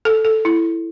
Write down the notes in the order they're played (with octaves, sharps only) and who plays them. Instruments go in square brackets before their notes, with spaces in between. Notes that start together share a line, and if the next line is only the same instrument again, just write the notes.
[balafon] A4
A4
E4